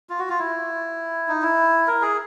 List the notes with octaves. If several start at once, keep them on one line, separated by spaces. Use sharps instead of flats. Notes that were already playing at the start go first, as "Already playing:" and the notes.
F4
F#4
F4
E4
D#4
E4
A#4
G#4